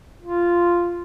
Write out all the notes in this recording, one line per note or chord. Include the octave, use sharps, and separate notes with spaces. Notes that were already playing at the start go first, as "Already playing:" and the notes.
F4